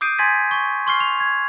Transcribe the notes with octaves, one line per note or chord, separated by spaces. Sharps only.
D6 D#6 G6 C7 D7 D#7
G#5 C6 G#6 A6 B6 D#7
C#6
C6 C#6 F6 C7
F7
G#6